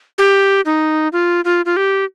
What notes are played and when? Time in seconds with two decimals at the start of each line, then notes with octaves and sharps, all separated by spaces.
0.18 G4
0.65 D#4
1.13 F4
1.45 F4
1.66 F4
1.77 G4